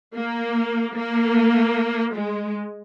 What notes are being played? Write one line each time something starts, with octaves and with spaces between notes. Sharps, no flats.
A#3
A#3
G#3